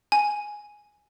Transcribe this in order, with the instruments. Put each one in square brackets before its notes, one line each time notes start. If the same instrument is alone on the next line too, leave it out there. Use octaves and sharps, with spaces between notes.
[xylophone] G#5